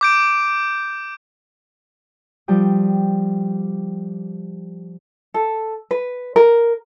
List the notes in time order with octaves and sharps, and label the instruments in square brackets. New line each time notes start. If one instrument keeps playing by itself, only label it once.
[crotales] D6 G6 D7
[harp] F3 G3 G4 G5 D#6
[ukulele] A4
B4
A#4